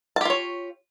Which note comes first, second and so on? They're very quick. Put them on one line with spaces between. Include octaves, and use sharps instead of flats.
A5 G4 F4 C#5